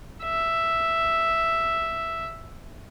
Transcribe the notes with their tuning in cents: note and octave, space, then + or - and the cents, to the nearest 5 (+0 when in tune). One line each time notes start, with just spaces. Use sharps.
E5 +5